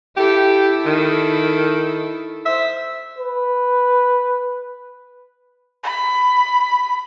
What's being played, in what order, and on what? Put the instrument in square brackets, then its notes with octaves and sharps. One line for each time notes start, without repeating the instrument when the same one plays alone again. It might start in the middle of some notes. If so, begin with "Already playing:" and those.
[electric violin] E4 A4 [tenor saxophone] G4
[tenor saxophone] D#3
[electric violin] C5 [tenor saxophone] E5
[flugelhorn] B4
[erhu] B5